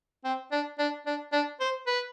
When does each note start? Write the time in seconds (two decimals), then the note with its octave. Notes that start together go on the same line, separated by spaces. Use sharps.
0.24 C4
0.52 D4
0.79 D4
1.06 D4
1.32 D4
1.60 C5
1.87 B4